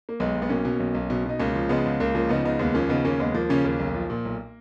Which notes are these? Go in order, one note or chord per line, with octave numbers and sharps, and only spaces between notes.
A#3
B1 G#3 B3
B1
B3
B2 A#3 C#4
B2
B1
B1
B2
B2 D#4
C#2 A#3 C#4
F3
C#3 G#3 B3
C#2
C#2 A#3
F3 A#3 C#4
C#3 B3 D#4
C#2 B3 D#4
D#2 G#3 B3
F3 A#3 C#4
C#3 B3 D#4
D#2 A#3 C#4
D#2 G#3 B3
F3 A#3
C#3 A#3 C#4
D#2 A#3
B1
F3
A#2
B1